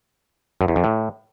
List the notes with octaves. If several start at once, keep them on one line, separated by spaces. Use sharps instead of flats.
F#2
E2
F2
A2